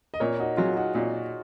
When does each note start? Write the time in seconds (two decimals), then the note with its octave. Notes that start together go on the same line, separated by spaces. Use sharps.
0.14 D#5
0.20 A#2 A#4 C#5
0.40 D#4 F#4
0.57 F#3 F4 G#4
0.76 D#4 F#4
0.94 A#2 D#4 F#4